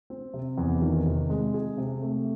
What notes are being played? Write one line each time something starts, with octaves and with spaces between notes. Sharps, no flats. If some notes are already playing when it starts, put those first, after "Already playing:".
C4
C3
E2
D#3
C3
G#3
G#4
C3
A3